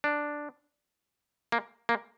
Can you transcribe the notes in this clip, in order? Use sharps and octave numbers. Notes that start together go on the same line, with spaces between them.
D4
A#3
A#3